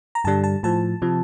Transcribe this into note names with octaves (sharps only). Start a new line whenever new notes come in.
A#5
G2 D3 G3 A5
A5
A2 F3 A5
C3 F3